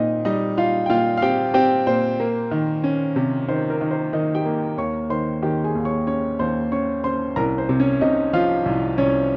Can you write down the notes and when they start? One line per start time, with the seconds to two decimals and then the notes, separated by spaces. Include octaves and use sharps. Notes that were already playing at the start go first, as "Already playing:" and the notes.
Already playing: A#2 C4 D#4 D#5
0.25 G3 D#4 D#5
0.58 D#4 F4 F5
0.86 G5
0.90 A#2 F4 F5
1.17 F5
1.22 C4 G4 G5
1.54 C4 G4 G5
1.87 A#2 C5
2.20 A#3
2.51 D#3
2.84 C#4
3.16 C3
3.49 D#3 C5
3.70 A#4
3.81 D#3
3.91 C5
4.13 D#3 D#4 D#5
4.35 G4 G5
4.45 A#3
4.77 D#2 C#5 C#6
5.10 D#3 C5 C6
5.42 D#3 G4 G5
5.64 G#4 G#5
5.75 D#2
5.85 C#5 C#6
6.07 C#4 C#5 C#6
6.39 D#2 C5 C6
6.72 C#4 C#5 C#6
7.04 C#4 C5 C6
7.36 C2 A#4 A#5
7.58 C5
7.69 C3
7.80 C#4 C#5
8.01 C3 D#4 D#5
8.33 F3 F4 F5
8.66 C2
8.98 C2 C#4 C#5